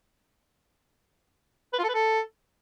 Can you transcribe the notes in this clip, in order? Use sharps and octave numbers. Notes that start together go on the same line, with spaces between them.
B4
F4
A4
B4
A4